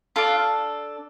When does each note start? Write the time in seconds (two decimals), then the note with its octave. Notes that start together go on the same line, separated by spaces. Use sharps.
0.16 D4 F4 A4 F5